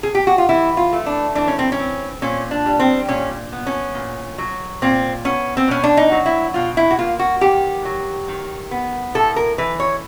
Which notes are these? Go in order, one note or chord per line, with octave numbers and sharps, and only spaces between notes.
G#4
G4
F#4
F4
E3 E4
F4
A3
D4
E3 D4
C#4
C4
C#4
C4
A#2 C#4
D4
G3
C4
A#2 C#4
B3
C#4
A#2
F#3
A#2 C4
B3 C#4
C4
B2 C#4
D4
D#4
F#3
E4
B2 F4
E4
F#4
A#3 F4
F#4
D#3 G4
F#3
D#3
B3
A2 A4
A#4
E3 B4
C#5